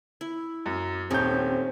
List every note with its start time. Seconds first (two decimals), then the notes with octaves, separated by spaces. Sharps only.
0.21 E4
0.66 F#2
1.10 D#1 A3 C4 C#4 D#4 G6